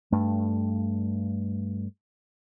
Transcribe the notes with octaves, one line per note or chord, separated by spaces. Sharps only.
G2 A3